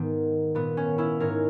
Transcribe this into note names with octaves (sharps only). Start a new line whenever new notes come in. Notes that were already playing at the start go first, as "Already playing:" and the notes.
Already playing: G#2 D#3 B3
A#2 B3
C#4
C#4 E4
G#2 D#3 A#4 C#5